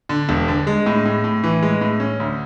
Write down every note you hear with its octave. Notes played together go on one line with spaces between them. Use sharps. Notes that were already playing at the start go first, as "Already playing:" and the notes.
D3
E1
D3
G#3
A2
A2
A2
E3
G#3
A2
C#4
D2